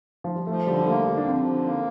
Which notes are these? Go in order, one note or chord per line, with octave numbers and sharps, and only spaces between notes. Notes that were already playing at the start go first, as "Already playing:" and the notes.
F3
G3
F3 A3
D3 G3
G3
A3 A#3
D3 G3
D4
F3 C4
D3
A#3